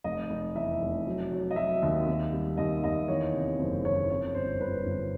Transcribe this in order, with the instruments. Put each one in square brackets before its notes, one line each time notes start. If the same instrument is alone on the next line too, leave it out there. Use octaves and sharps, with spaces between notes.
[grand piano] F1 D#5
F1
E2 E5
F1
F#3
F#3
D#5
F#3 E5
D#2
D#2
G3
D#2 D#5
D#2 D#5
E2 C#5
C3
F#1 C5
E2 C#5
F2 C#5
G1 C5
G1 B4
G1